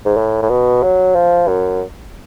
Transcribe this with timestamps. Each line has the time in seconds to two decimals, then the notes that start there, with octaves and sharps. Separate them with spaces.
0.06 G#2
0.17 A2
0.42 A2
0.50 B2
0.83 F#3
1.15 F3
1.48 F#2